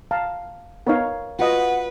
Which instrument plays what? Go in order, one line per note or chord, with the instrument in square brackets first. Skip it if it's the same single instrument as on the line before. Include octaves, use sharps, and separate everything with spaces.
[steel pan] F5 A5 A#5
[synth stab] B3 D#4 [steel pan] A#4 C#5 F5
[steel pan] F4 F#4 D#5 [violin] B4 [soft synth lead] F#5